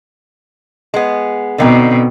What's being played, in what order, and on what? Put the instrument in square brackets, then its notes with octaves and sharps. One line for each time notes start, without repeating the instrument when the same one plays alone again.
[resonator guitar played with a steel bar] G#3 B3
[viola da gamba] B2 C4 [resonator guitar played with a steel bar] D3 D#4 G5